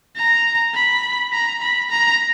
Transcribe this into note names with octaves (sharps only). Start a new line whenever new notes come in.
A#5
B5
A#5
B5
A#5